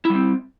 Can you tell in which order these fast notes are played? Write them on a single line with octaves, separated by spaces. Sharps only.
E4 G3 C4